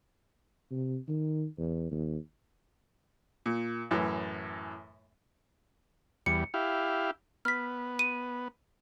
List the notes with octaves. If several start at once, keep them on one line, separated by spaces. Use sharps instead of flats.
C3
D#3
E2
D#2
A#2
F#2 A2 E3
E2 G3 C#7
E4 G4 F5
B3 F6 B6
D#7